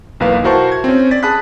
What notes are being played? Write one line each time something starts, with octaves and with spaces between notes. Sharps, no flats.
B1 E2 A#3 B4 F5
E4 F#4 A#4 C5 A5 C#6
G#6
C4 C#4
D5 A6 B6
G#4 A5 B5 D#6 F#6 B6